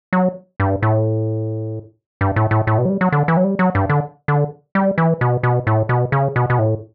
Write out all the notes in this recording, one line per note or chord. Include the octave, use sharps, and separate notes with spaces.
F#3
G2
A2
G2
A2
A2
A2
B2
F#3
G3
F#3
D3
E3
F#3
G3
F#3
G2
D3
D3
G3
E3
B2
B2
A2
B2
C#3
B2
B2
A2